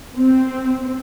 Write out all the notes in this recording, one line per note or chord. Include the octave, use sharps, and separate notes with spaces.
C4